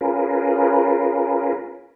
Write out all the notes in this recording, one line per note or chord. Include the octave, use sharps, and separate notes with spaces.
C#4 F4 G#4 A#4 B4